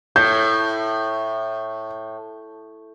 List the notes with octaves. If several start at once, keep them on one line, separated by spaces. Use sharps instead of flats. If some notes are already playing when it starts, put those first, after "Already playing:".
A2 G6